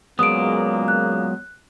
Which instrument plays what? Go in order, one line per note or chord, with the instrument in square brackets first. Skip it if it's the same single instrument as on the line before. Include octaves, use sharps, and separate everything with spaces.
[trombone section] C#2 A#2 A#3 [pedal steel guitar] F#3 G#3 B3 [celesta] D#6 D7
[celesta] F#6